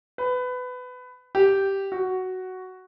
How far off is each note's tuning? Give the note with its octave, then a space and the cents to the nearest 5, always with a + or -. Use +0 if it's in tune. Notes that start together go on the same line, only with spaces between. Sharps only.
B4 +20
G4 -5
F#4 +5